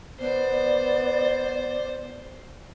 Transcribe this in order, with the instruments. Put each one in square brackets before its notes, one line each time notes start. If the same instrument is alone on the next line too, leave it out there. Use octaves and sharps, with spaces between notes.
[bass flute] B3 [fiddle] C5 [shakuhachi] D5